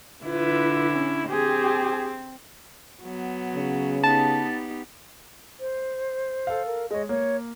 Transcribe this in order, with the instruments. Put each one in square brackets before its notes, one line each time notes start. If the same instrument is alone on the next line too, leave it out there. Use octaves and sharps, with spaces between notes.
[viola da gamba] D3 E4 [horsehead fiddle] F4 B4
[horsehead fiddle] C#4
[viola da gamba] C4 [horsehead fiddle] G4 G#4
[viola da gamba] F#3 B3
[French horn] C#3
[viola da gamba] B3 D#4 G4 [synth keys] A5
[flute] C5
[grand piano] A4 F5
[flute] A#4
[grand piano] G#3 C#5 [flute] D#5
[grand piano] A#3 [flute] C#5